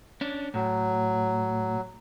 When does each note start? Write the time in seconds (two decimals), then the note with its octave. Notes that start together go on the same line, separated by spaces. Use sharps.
0.21 C#4 D4
0.54 A2 F#3